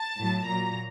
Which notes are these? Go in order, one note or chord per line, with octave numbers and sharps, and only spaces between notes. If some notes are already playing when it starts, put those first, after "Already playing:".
Already playing: A5
A2 F#3
A#2 F#3 A#5